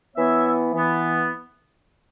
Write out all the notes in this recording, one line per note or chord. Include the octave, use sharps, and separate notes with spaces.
E3 B3 C#5 E5
E3 B3